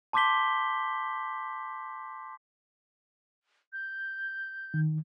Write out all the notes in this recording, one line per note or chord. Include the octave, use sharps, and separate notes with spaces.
A5 C6 D6 G6 B6 G7
G6
D#3